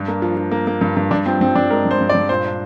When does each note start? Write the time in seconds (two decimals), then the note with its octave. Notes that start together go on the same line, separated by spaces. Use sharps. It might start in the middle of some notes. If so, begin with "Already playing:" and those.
Already playing: G2 D4
0.08 A#3
0.22 F3
0.37 F3
0.51 A#3
0.67 A#3
0.81 G2
0.97 G2
1.11 G2 D4
1.26 F3 C4
1.41 G2 C4
1.55 G2 D4
1.71 G#3 A#4
1.85 G2
1.91 C5
2.01 G2
2.09 D5
2.15 G2
2.29 A#2 C5
2.44 D4